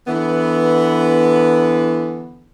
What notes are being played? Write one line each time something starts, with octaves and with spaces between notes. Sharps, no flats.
D3 E3 B3